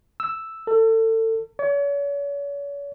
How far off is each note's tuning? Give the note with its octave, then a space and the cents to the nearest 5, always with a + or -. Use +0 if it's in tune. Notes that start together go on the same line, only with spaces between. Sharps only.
E6 +0
A4 +30
C#5 +40